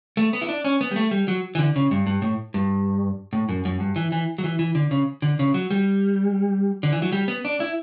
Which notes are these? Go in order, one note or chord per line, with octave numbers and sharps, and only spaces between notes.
A3
B3
E4
D4
C#4
B3
G3
A3
G3
F#3
E3
D3
C#3
G2
G2
A2
G2
A2
F#2
F#2
G2
E3
E3
F#3
E3
E3
D3
C#3
D3
C#3
F#3
G3
D3
E3
F#3
G3
B3
D4
E4